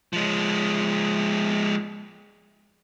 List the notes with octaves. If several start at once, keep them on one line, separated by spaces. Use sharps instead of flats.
F3 G#3